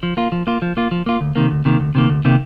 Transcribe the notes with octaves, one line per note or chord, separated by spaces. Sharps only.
F3
A#3 F4
F3
A#3 F4
F3
A#3 F4
F3
A#3 F4
D2
C3 D#3 A#3
D2
C3 D#3 A#3
D2
C3 D#3 A#3
D2
C3 D#3 A#3